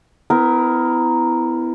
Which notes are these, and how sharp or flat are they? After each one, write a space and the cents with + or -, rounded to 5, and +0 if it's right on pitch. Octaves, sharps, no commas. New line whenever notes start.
B3 +35 E4 +0 A#4 +0